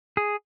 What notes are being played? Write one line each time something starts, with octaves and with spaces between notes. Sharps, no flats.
G#4